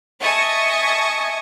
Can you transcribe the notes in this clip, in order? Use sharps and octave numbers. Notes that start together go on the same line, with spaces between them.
D#5 E5 G#5 A5 C#6 D#6